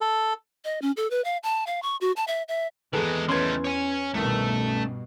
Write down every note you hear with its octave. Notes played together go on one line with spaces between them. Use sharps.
A4
D#5
C#4
A4
B4
F5
A5
F5
C#6
F#4
A5
E5
E5
E2 D#3 G#3 G#4 A4 B4
D#3 A3 C#4 B4 C6 G#6
C#5 G#5
C2 G2 B2 D#3 A3